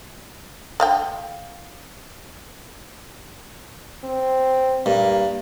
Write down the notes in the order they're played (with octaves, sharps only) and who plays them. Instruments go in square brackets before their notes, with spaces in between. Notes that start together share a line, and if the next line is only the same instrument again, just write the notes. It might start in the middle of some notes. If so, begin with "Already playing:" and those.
[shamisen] D3 F5 G5
[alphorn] C4
[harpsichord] G2 [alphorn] A#3